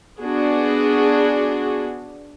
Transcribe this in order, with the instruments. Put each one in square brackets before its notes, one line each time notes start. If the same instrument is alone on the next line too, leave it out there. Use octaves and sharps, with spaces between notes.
[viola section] B3 D4 F#4 G#4